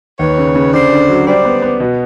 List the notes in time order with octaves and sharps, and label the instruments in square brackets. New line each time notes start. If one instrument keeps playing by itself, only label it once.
[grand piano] D#2 [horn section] B4 C#5
[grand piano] C#3
C#3
[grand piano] D3 [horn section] C5 D5
[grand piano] D3
F#3
[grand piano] G3 [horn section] C5 D5
[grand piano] B3
B3
B2